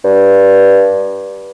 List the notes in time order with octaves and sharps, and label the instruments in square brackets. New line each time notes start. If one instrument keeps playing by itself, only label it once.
[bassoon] G2